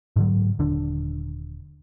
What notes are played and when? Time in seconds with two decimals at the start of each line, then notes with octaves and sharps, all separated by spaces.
0.16 G#2 D3 F#3
0.59 D#1 D3 D4